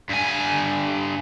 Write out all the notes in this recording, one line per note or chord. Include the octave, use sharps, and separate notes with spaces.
G2 G#5